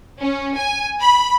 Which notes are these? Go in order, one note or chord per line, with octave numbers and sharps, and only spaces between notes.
C#4
G#5
B5